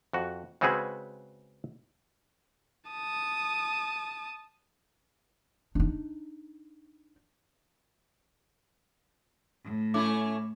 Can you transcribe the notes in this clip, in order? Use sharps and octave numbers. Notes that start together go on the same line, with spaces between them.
F2 F#4
C#3 G#3 C4 F#4 G#4 B4
A5 D#6
D4 D#4
A2
A3 C#4 E4 D6